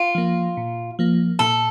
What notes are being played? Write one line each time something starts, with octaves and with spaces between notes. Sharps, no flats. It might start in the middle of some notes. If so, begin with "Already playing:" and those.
Already playing: F4
F3 A#3
A#2
F3 A#3
A#2 A4